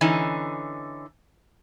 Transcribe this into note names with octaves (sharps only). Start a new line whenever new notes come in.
D3 E3 C#4 D#4